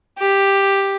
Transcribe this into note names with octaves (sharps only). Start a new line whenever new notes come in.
G4